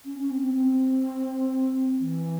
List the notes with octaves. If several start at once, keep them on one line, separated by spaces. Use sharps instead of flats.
C#4
C#4
C4
C4
C4
E3